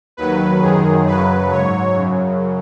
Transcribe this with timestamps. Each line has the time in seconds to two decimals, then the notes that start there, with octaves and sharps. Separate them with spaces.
0.17 D#2 D#3 F#3 B4
0.61 F#2 D#3 F#3 G#4
1.06 F#2 C#3 F#3 B4
1.50 G#2 F#3 C#5
1.96 F#2 C#3 F#3